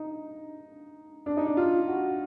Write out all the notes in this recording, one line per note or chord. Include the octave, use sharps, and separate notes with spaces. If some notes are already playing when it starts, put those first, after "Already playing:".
Already playing: D#4
D4
D#4
D4
F4
F#4